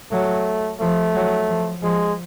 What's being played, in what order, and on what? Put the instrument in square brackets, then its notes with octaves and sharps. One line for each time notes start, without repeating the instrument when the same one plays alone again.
[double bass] F#3 [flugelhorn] A3
[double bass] F3 [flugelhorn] A3
[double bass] F#3
F3
[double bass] F3 [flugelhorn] G#3